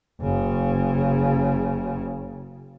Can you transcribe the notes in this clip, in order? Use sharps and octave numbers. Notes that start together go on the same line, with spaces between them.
F#1 C#3